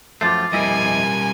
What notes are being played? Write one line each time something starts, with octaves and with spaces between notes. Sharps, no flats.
F#2 F3 A3 F4 D6 A6 C7
F2 G3 A#3 E4 D#5 G#5